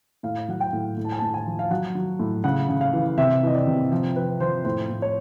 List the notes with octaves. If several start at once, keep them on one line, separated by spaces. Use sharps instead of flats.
A2 F5
F#3 F#5
G5
A2
A2
A5
G#5
A2 A5
G#5
F3
F5
F#3 F#5
F#3
A2
C#3 F#5
C#3
F5
E3
C3 E5
E3 D#5
D5
C3
F3
F3 B4
F3 C5
A2 C5
A2
C#5